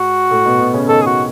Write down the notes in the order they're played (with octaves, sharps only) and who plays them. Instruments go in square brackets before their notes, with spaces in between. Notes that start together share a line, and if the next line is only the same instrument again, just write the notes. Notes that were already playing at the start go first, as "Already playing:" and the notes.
Already playing: [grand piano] G#2 [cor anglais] F#4
[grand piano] A2 A3
B2 B3
B2 B3
C#3 C#4
[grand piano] D#3 D#4 [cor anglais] A4
[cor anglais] G#4
F#4